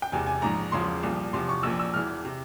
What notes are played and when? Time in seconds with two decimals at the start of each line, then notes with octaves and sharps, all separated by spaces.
0.02 G5
0.12 E1 E2 C3 G#5
0.27 G#5
0.42 A#1 G#2 F3 A#5
0.72 E1 E2 C#3 F3 C6
1.03 C2 A#2 F3
1.33 E2 C3 F3 C6
1.49 C#6
1.63 A#1 A#2 F3 E6
1.79 E6
1.94 E1 E2 E3 F6
2.25 C3